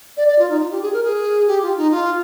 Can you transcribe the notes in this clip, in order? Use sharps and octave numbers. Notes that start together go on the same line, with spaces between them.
D5
D5
F4
D#4
F4
G4
G#4
A#4
G#4
G4
F4
D#4
F4